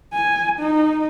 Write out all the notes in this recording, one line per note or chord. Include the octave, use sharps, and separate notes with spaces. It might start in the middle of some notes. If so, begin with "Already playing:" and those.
G#5
D#4